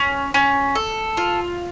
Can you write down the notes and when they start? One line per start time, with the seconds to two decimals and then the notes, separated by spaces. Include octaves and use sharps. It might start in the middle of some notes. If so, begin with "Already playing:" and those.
Already playing: C#4
0.34 C#4
0.75 A4
1.17 F4